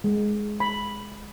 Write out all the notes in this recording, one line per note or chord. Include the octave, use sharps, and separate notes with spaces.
G#3
B5